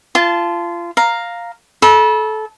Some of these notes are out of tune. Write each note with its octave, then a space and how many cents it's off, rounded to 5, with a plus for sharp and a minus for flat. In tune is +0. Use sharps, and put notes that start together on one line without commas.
F4 -25 A5 -10
F5 +5 A#5 +0
A4 -20 B5 -35